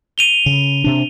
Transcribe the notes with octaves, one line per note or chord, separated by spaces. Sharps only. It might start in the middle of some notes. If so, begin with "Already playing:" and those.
D#7 F7 G7
C#3
C3 D4